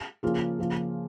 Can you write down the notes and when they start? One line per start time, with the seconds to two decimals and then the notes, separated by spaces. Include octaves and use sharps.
0.23 C#3 F3 A#3 F4 G#4
0.59 C#3 F3 A#3 F4